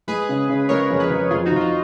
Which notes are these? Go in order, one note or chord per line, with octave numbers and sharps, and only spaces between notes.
G#3 G#4 B4
C#3
C#3
G#3 A#4 C#5
F2
G#4 B4
F2
F2 F4 G#4
D#4 F#4
F2 F4
D#4